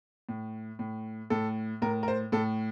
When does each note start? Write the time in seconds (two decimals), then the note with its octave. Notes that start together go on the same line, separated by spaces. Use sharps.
0.29 A2
0.79 A2
1.30 A2 A4
1.82 A2 A#4
2.03 A#4
2.08 C5
2.32 A2 A4